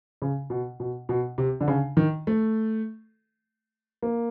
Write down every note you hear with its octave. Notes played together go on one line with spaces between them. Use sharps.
C#3
B2
B2
B2
C3
D3
C#3
D#3
A3
A#3